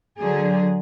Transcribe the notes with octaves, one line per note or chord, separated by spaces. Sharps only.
D3 F#3 G#4